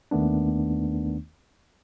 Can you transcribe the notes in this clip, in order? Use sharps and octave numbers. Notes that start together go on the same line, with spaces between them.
D#2 D#3 A3 B3 D4